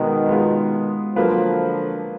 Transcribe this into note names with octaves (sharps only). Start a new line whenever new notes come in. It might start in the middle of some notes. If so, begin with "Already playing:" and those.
Already playing: B2 D#3 G#3 B3
G#3 B3 F4
D3 F3 F#3 A#3 F4 B4